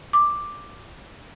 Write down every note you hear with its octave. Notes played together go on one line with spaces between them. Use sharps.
D6